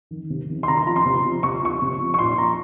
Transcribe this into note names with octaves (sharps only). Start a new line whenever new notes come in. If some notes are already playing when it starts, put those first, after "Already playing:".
D#3
C3
D#3
C6
C3 A#5
C6
F3 A#5
C6
C3
F3
C3 C#6
F3 C#6
C3
F3
C#6
A#2 C6
F3 A#5